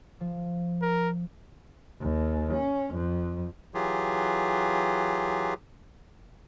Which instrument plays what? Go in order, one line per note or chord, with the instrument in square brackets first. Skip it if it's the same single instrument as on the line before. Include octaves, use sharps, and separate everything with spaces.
[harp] F3
[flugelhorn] A#4
[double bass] D#2
C#4
F2
[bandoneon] E3 F#3 F4 G4 G#4